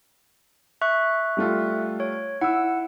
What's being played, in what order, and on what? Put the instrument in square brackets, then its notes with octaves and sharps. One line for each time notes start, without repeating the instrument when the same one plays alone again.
[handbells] E5 C#6 F#6
[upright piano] G3 A3 F4
[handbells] C#5
[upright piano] E4 [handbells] F#5 E6